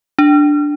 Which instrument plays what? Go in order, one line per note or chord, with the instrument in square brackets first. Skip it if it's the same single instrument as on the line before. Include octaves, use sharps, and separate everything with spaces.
[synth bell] D4